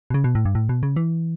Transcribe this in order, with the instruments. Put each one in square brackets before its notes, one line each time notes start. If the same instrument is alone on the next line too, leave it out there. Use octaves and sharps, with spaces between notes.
[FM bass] B2
C#3
B2
A2
G2
A2
B2
C#3
E3